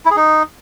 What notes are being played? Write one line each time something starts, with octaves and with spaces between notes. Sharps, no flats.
E4
G#4
D#4